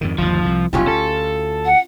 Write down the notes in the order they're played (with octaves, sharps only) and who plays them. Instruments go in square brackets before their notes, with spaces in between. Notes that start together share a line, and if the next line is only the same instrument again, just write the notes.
[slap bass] F2 G#2 D#3
[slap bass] G1 D#2 [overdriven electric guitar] F3
[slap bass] C2
[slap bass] F1 B1 [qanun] C#4 F4 G4
[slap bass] D2 [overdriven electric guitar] A4
[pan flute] F#5